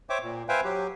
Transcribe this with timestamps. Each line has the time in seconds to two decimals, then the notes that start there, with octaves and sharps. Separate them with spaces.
0.10 C5 C#5 E5 G5 D6
0.22 A#2
0.49 B4 C5 E5 F5 G5 G#5
0.64 F#3 G4